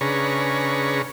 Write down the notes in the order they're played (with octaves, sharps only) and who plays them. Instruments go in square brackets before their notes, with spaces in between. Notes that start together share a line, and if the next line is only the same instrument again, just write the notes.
[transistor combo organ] C#3 D4 G#4 B4 A#5 C#6